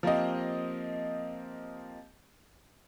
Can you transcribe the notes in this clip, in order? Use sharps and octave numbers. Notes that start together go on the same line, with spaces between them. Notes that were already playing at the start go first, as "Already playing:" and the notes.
F3 A#3 C4 G4 D#5